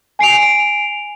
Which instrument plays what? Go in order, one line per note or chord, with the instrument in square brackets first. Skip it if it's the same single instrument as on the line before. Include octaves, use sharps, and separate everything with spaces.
[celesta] G#5 C7 D7 F7